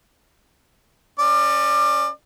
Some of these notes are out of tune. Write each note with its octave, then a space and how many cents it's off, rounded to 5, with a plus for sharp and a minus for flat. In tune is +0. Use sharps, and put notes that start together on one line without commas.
C#4 -10 D5 +25